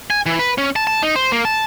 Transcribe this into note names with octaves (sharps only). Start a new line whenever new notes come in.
G#5
E3
B4
C#4
A5
A5
D#4
C5
A#3
A5